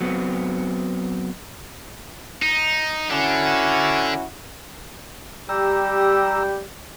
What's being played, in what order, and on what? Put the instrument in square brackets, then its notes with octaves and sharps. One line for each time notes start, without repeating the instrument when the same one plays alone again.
[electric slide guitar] F#3 B3 C4
[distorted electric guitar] D#4
[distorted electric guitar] D3 [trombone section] C#4 E4 F#4
[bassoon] G3 [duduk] G4 [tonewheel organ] A#5 E6